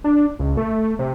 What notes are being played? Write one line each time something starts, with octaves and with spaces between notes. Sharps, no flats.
D4
C#2
A3
C3